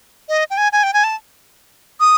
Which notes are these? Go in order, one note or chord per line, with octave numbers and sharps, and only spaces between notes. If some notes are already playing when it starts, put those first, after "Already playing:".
D#5
G5
G#5
G#5
G5
G#5
A5
D#6